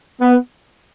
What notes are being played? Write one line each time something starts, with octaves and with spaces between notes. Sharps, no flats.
B3